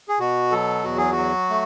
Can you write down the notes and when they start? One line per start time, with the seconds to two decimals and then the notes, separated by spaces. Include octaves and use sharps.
0.09 G#4
0.19 B2 F#4
0.51 F#3 A4
0.84 E2 F#4
0.97 G#4
1.12 F#4
1.17 F#3
1.50 A3